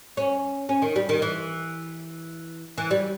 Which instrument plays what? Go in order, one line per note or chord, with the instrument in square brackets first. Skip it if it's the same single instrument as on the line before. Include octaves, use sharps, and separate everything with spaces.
[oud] C#4
C#4
D#3
G3
D#3
E3
E3
G3